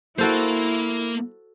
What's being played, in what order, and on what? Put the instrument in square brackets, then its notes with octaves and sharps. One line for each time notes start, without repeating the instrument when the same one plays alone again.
[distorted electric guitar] A#3 [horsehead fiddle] E4 [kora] F#4 A4 C5